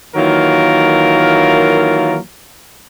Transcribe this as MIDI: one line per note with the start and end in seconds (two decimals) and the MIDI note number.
0.16 2.18 51
0.16 2.18 52
0.16 2.18 54
0.16 2.18 58
0.16 2.18 65
0.16 2.18 70